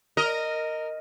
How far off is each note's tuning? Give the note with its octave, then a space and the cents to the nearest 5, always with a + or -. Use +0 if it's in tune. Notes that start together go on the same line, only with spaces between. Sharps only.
A#4 -10 D#5 +0